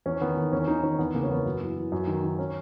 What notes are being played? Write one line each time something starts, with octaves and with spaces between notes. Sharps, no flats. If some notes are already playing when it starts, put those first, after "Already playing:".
E2 C#4
D#3 B3
D#3
E2 C#4
D#3 D#4
D#3 C#4
E2 B3
C#3 A#3
C#4
E2 B3
F#2
E3
E3
F#2
D#3
D#3
C#4